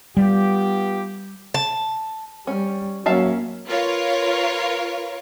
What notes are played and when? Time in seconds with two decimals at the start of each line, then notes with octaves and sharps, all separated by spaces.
0.17 G3 B3 F4 G4
1.54 A5
2.47 G3 C#4
3.06 F#3 A#3 C#4 E5 F5 A5
3.67 F4 A#4 B4 C#5 F5